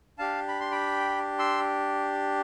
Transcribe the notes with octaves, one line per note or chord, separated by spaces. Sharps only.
D4 G4 F5 A5
B5
C6
G5 B5
C6 E6